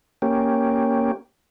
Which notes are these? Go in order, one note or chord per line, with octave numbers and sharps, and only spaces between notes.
A#3 C#4 G4